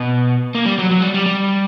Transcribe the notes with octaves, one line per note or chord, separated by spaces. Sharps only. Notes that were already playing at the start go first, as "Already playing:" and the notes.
Already playing: B2
A#3
G3
F#3
F#3
G3
G3
G3